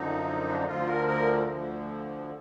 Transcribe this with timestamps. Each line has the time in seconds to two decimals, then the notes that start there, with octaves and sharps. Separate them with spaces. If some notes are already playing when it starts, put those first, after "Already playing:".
Already playing: F#2 D3 F3 D#4
0.48 D4
0.57 D#4
0.67 D2 D3 F3 F4
0.87 A#4
1.07 A#4
1.48 D2 D3 F3